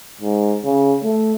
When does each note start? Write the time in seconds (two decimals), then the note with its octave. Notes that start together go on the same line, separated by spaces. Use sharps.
0.21 G#2
0.64 C#3
1.03 A3